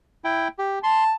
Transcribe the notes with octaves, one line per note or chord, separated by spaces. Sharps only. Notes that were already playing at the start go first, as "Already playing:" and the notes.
E4 G5
G4
A5 C6